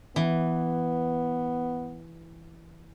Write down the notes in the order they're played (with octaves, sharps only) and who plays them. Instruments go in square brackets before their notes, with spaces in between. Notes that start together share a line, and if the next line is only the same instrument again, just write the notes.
[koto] E3 [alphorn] B3